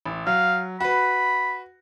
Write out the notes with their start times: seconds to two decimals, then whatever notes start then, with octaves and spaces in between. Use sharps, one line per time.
0.06 A1
0.27 F#3 F5
0.80 F#4 B4 B5